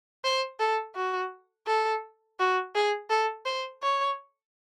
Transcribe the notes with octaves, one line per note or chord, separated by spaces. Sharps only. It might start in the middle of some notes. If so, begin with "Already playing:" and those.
C5
A4
F#4
A4
F#4
G#4
A4
C5
C#5